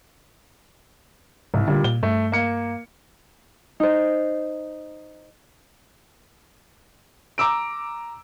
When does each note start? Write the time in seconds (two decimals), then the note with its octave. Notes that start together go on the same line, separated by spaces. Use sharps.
1.54 C2 G#2
1.68 A#2 D3 G3
1.84 A#2 G7
2.03 G2 A3
2.32 A#3 C#7
3.80 D#4 C5
7.38 A#5 D6 E6 D7